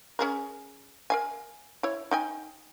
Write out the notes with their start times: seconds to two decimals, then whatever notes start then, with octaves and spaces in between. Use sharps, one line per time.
0.19 C#4 G#4 A#4
1.10 A#4 F5 G#5
1.83 E4 C#5
2.11 D#4 G5 G#5